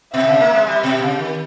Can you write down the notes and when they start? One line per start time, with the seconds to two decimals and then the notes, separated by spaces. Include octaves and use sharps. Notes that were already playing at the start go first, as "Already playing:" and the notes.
0.14 B2 E5
0.27 C#3
0.40 A#3
0.53 G#3
0.67 G3
0.83 B2
1.02 C#3
1.19 D#3